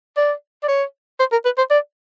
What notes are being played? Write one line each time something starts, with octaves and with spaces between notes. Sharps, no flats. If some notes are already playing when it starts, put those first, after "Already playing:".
D5
D5
C#5
C5
A#4
B4
C5
D5